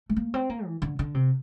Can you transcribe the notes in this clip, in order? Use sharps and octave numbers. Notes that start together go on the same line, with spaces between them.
A3
A#3
C4
A#3
E3
D3
D3
C3